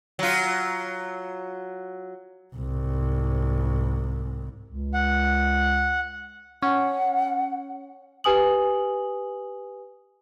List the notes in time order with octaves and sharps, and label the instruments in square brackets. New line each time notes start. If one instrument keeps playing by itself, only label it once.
[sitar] F#3 F4
[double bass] C2 G#2
[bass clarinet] C#2
[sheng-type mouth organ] F#5
[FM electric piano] C#4 [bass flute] F#5
[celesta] G4 B4 G#5 D#6 F#7